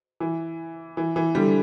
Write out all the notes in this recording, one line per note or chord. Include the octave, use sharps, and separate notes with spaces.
E3
E3
E3
D3 G3